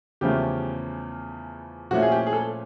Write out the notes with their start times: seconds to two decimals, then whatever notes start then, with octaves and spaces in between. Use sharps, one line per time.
0.21 E2 C#3 F3 A3 C#4 G4
1.91 A#2 F3 A3 C#4 E4 F#4
2.03 G#4
2.12 G4
2.27 G#4
2.33 A4